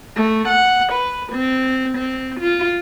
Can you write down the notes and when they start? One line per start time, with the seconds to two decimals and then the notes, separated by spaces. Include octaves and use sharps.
0.16 A3
0.48 F#5
0.92 B4
1.32 C4
1.97 C4
2.40 F4